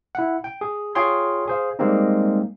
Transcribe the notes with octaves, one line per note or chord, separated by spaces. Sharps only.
E4 F#5
G5
G#4
F4 G#4 C#5 G5 C6 D#6
G#4 C5 F5
G3 G#3 A#3 C4 D#4